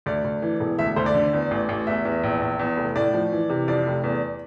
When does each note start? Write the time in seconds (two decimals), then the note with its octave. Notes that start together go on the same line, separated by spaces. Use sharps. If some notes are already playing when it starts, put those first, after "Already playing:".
0.06 D2 D5
0.24 D2
0.42 E3
0.60 E1
0.79 D2 E5
0.96 D2 C5
1.06 D5
1.14 D3
1.33 E2
1.51 A1
1.69 A1
1.87 E2 E5
2.05 E2
2.23 A#1
2.42 A#1
2.59 E2
2.77 F1
2.96 A2 D5
3.14 F3
3.32 E3
3.50 C3
3.68 F2 D5
3.86 F1
4.04 E2